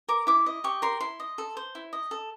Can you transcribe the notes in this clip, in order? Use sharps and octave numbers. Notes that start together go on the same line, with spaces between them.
A#4 D6
E4 D6
D#5
G4 C#6
A#4 C6
E4 C6
D#5
A4
C5
E4
D#5
A4